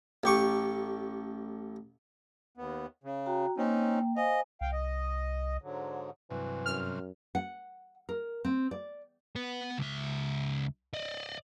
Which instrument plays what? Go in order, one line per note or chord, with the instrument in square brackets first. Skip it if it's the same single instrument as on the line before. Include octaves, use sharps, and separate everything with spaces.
[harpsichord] A1 G4 C#6 D6
[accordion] D#2 B3
C#3
[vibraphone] F#4 G5 A#5
[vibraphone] A#3 G5 [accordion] C4 C#4 D#4
[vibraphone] C5 F5 G#5 [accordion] D#5
[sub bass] C2 [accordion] F5 G5
[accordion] D#5
G#2 D3 F#3
[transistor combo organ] G2 C3 F#3 [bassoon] E3
[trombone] F#2 [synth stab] F6
[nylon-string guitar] F#5
A#4
C4
D5
[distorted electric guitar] B4 F#5
C#2 E5
D5 D#5